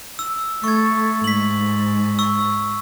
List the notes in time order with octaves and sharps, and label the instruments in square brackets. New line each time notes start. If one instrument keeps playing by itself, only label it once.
[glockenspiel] E6
[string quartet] A3 [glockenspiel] C#6 G#6
[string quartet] G#2 [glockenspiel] B6 F#7
[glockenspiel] C#6 E6